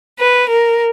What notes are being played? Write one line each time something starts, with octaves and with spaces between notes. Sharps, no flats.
B4
A#4